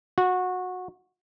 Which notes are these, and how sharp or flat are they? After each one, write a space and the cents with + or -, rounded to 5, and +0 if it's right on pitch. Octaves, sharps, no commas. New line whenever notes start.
F#4 -20